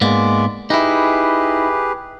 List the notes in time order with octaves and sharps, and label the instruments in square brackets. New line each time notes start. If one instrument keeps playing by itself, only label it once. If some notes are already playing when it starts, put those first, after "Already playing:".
[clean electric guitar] G#2 A#3 B3 [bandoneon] G#3 D5
[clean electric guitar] D#4 E4 [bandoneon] G4 G#4 B4